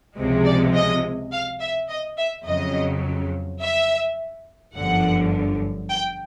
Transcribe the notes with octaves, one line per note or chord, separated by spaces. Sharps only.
C#2 C3 F3 G#3
D5
D#5
F5
E5
D#5
E5
F2 C#3 F#3 D#5
E5
G1 F#2 D3 F3 F#5
G5